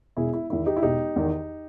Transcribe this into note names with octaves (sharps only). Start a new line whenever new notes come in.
E1 E4 G#4
E4
E2 D#3 E4
D#4 G4
E4
E1 D#4 G4
E2 D#3